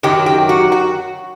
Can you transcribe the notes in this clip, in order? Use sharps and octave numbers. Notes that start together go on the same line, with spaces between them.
F#2 D#3 F#3 G4
G4
F#4
F#4